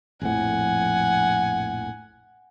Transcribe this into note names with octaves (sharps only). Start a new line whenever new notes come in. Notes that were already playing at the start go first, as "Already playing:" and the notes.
A#1 F2 A2 F#5 G#5